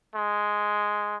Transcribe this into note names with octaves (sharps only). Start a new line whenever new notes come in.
G#3